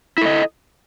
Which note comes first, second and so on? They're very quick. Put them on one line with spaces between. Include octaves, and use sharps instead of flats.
E4 A4 D#5